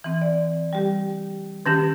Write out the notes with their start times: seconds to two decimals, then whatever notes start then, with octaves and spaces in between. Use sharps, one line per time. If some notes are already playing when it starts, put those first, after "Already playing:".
0.04 E3 C4
0.21 D5
0.73 G3 G4
1.66 D#3 C#4 G4 G6